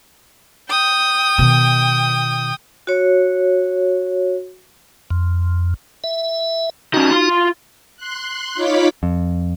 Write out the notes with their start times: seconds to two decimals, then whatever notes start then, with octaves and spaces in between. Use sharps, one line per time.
0.69 G5 D#6
1.38 B2 D#3
2.87 F#4 C#5
5.11 F2
6.04 E5
6.94 D#3 C#4 D#4 F#4
7.11 F4 C6
7.97 C6 F#6
8.55 D#4 F4 C#5 B5 D6 B6
9.03 F2